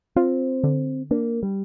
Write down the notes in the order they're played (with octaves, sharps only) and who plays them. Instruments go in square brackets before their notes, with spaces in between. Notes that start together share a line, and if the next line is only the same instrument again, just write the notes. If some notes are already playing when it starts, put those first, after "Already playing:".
[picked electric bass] C4 [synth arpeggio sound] F4
[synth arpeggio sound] D3
[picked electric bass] A#3 [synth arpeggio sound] D4
[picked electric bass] G3